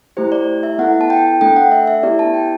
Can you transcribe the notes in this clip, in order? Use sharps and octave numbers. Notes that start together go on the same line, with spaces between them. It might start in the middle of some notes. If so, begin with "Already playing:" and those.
A3 E4 G4 C5
D5
E5
B3 E4 A4 F#5
A5
G5
A3 D4 A4 G5
F#5
E5
E5
B3 E4 G4 D5
A5
G5